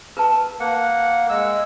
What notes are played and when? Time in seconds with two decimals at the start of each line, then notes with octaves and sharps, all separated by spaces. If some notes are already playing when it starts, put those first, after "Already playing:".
0.17 A#4 B4 A5
0.60 A#3 F#5
1.29 G#3 E6